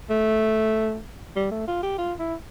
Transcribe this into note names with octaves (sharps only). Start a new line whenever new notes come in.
A3
G3
A3
F4
G4
F4
E4